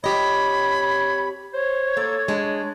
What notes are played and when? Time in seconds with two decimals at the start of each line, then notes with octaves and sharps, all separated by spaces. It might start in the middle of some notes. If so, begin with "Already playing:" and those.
0.04 F2 G4 C#5 D#5 B5
1.54 C5 C#5
1.97 A#3 A4
2.28 G#3 D4